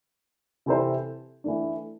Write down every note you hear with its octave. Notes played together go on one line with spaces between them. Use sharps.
C3 E3 C4 A4 C5
E3 A3 D4